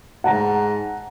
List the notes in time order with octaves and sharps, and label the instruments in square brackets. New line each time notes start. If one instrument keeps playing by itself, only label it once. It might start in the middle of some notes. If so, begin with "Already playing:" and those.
[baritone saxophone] G#2 [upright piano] F#5 A5 A#5